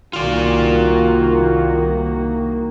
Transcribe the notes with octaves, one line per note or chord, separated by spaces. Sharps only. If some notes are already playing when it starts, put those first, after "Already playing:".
C2 D#3 A#3 F4 F#4 D5